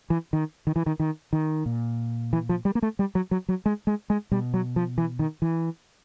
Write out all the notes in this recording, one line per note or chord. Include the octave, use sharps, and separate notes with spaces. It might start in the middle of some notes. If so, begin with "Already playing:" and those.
E3
D#3
D#3
E3
D#3
D#3
D#3
A#2
E3
F3
G3
A#3
A3
G3
F#3
F#3
F#3
G#3
G#3
G#3
B2 G3
F#3
F3
E3
D#3
E3